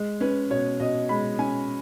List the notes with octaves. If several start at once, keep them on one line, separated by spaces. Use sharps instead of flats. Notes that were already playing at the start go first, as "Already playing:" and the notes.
Already playing: G#3
C#4 B4
B2 C#5
B2 D#5
G#3 B5
C#4 G#5